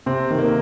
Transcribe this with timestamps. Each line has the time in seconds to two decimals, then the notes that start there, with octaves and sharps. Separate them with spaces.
0.06 C3 C4
0.30 D#3
0.38 A#3